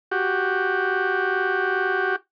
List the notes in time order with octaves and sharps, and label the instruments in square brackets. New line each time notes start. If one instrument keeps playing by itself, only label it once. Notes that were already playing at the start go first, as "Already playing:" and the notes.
[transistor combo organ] F#4 G4